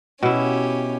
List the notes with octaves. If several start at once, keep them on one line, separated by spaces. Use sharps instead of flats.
B2 C#4 E4 G4